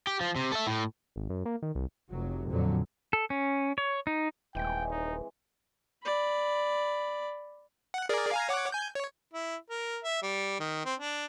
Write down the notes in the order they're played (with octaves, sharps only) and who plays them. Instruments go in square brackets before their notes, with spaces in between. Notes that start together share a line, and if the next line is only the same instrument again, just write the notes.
[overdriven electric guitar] G4
F3
C3
A4 E5
A2
[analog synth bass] G#1
F#2
A#3
D#3
C2
[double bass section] F1 F#3
F2 A#2 D3 F#3
[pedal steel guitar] A4
C#4
C#5
D#4
[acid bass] D#1 [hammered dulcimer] E3 G#3 C4 [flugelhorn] G5
[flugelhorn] D#4
[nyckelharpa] D5 B5
[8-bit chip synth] F#5
G#4 A#4 D5
F5 G#5 A#5
C#5 F#5 D6
G#5 G6
C#5
[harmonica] E4
A#4
E5
G3
D#3
C4
D4